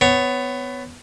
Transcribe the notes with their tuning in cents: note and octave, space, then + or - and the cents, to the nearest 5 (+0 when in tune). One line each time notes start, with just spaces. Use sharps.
B3 +20 C#5 +0